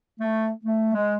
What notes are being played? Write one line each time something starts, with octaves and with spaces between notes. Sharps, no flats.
A3
A3
G#3